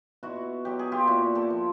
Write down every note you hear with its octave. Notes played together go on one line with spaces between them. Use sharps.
B2 E4 F#4
F#3 G4
G#4
F4 G4
A#2 E4 F#4
G4 A4
F3